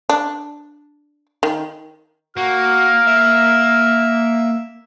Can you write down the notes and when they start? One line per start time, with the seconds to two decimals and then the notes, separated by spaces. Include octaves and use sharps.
0.09 D4
1.43 D#3
2.37 A#3 F#4 F6
3.07 E5